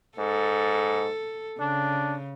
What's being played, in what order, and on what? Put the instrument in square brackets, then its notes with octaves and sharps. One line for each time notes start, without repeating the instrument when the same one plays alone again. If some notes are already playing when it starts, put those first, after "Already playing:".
[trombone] G#2 [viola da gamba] A4
[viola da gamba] C#3 [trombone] D4